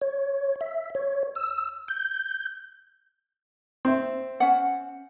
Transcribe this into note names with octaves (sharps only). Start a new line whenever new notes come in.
C#5
E5
C#5
E6
G6
C4 E5
C#4 F#5